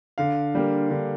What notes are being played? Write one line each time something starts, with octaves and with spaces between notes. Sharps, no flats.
D3 F5
G3 A#3
D3